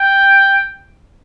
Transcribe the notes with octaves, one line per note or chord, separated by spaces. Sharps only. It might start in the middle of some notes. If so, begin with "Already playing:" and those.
Already playing: G5